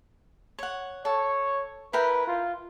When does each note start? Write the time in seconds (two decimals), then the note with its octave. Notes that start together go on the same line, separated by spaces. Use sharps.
0.59 C#5 F#5
1.05 A4 C#5
1.93 E4 A#4 B4 G5
2.27 F4